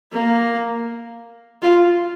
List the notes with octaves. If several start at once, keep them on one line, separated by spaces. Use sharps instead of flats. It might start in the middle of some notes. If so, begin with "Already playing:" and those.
A#3
F4